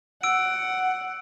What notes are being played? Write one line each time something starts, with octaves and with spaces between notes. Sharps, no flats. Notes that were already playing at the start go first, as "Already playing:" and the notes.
F#5 E6 D7